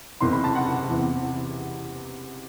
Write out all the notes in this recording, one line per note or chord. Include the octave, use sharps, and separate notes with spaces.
F#1 E2 C3 C6
B5
A5
F#5
E2 C3 E3